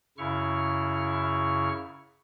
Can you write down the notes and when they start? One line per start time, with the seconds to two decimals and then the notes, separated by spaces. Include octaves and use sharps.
0.18 F#2 C#3 E4 C#6 F6